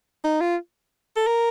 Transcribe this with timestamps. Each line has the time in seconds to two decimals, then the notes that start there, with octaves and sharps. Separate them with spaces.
0.24 D#4
0.41 F4
1.16 A4
1.27 A#4